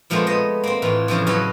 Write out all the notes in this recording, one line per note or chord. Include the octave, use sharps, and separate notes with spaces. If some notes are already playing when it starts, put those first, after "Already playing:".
A#2 F3 G#3 A3 B3 C4
B3 D#5
A#3 C4
A2 E3 F4
F2 C#3 E3 F3
F#3 C#4 A4 B4 D#5